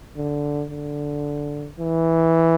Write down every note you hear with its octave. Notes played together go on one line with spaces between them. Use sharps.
D3
D3
E3